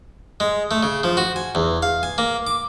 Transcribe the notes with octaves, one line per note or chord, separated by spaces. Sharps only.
G#3
A3
C#3
F3
F#4
G#5
E2
F5
G#5
A#3
D6